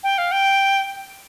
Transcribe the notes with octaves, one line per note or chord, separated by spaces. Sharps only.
G5
F5
G5